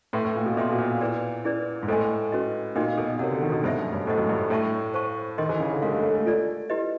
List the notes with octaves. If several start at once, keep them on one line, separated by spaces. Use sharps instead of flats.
A2 B4 E5 G5 C6
A2
A#2
B2
A#2 B4 E5 G5 C6
B2
A#2
E4 G#4 B4 D5 G5
C#4 E4 G#4 B4 D5
G#2
A2 A4 C5 D#5 G#5 C6
C#4 F#4 B4 D#5
A#2 D#4 F#4 A#4 D#5 G5
B2
C3 A#4 C#5 F#5
D3
D#3
B2
G2 A4 C5 E5
F#2
G2
A2 A4 C5 D#5 F#5
F#2
G2
A2 A4 C#5 E5 A5 C#6
C5 F5 A5 C#6
D#3 A#4 D#5 G5 C6
E3
C#3
D3
G#3 G4 A#4 C#5 F5
A3
A3
A3
F4 A4 D5 F#5
E4 G4 B4 D#5